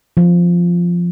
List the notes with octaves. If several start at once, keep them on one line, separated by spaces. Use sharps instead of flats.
F3